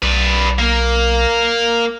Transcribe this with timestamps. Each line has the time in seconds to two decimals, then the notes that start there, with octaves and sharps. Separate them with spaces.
0.02 B1 B4 D5
0.59 A#3